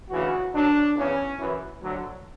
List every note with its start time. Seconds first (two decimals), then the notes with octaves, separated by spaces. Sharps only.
0.10 D2 C#3 E3 F#4
0.53 F#2 D3 F#3 D4
0.95 E2 C#3 E3 C#4
1.37 F#2 E3
1.81 D2 D3 F#3